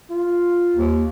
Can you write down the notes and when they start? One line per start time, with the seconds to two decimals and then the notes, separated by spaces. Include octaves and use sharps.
0.10 F4
0.76 D#2